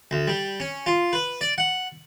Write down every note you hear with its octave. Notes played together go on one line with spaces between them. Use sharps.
D2
G3
C#4
F4
B4
D5
F#5